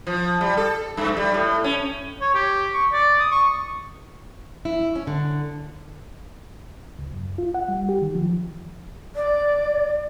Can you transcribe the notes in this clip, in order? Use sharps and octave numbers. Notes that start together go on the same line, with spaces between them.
F3
G3
A4
G2
G3
A2
C#4
C#5
G4
C#6
D5
D#6
C#6
E4
C#4
D3
C#2
F#2
F4
F#5
G3
G4
D#3
F3
D5